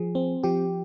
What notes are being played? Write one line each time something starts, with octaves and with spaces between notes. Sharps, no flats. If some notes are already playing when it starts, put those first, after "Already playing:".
Already playing: F3 G#4
C4
F3 G4